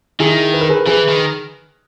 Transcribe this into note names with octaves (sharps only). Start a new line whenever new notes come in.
D#3 E4 G#4
B4
A#4
G#4 B4
E3 G#4 B4
D#3